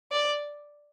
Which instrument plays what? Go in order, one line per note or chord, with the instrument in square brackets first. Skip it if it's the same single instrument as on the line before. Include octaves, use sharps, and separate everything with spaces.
[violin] D5